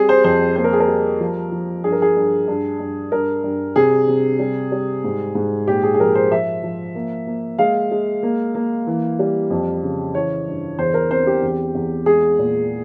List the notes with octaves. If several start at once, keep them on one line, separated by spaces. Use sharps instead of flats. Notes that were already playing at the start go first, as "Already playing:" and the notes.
Already playing: G3 C4 G#4
C5
F2 C5
A#3 C5
A#4
G#4
A#4
G3
F3
F3
G2 G#4
A#4
G#4
G2
G2
G2
G2 A#4
G2
C3 G#4
C3
G3
G3
G#2
G#2
A#2 G4
G#4
G#4
F3 A#4
C5
F3 E5
F3
A#3
A#3
G#3 F5
G#3
A#3
A#3
E3
G3
F2
C#3
E3 C#5
G2
E2 C5
A#4
C4 C5
G4
E2
E2
G#3 G#4
A#2